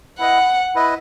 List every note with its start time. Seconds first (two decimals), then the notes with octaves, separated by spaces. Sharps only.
0.19 E4 B4 D#5 F#5
0.75 E4 B4 D#5